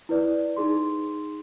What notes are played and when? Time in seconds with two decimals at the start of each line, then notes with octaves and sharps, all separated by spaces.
0.09 E4 B4 D5
0.57 D#4 G#4 C6